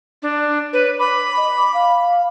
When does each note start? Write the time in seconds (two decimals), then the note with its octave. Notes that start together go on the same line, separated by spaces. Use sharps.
0.22 D4
0.73 B4 C#5
0.99 B5 D6
1.37 D#5
1.57 D6
1.74 F5